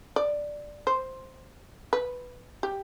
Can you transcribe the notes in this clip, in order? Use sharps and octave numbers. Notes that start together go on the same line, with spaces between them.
D5
C5
B4
G4